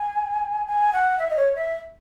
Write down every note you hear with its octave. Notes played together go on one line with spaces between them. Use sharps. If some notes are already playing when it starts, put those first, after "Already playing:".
Already playing: G#5
G#5
F#5
E5
D#5
C#5
E5